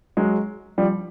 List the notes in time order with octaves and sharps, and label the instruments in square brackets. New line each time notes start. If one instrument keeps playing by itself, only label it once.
[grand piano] F#3 G#3
F3 G3